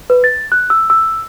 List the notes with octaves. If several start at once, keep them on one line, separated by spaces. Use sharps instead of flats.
B4
A6
F#6
E6
E6